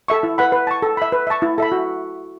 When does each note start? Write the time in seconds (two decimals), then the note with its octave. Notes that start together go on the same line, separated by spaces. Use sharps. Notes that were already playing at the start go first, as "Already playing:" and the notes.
0.08 A4 E5 C#6
0.23 E4
0.38 B4 F#5 B5
0.52 B4
0.67 A5 C#6
0.82 A4
0.97 E5 B5
1.12 B4
1.27 E5 A5 C#6
1.42 E4
1.58 A4 E5 B5
1.72 F#4